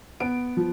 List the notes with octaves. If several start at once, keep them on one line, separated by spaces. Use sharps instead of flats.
B3 D7
F3